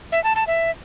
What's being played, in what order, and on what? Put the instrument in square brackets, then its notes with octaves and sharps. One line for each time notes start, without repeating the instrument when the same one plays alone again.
[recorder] E5
A5
A5
E5